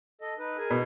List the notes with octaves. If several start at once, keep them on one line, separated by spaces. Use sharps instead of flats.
A4 D#5
D#4 B4
G#4 A#4 G#5
B2